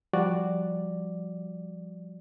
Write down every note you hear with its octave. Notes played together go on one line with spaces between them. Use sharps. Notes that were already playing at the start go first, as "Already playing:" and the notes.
F3 G3 F#4 D5